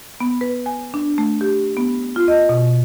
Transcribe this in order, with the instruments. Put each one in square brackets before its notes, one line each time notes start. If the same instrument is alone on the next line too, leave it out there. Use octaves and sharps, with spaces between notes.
[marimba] B3
B4
G#5
D4
A3
G4
B3
F4
D#5
B2